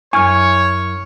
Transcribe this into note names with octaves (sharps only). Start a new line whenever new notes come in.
F#2 E4 C#5 G#5 C#6 F6